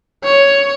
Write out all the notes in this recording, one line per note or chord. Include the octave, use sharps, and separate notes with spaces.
C#5